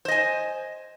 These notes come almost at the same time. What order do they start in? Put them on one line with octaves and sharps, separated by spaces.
C5 D#5 G#5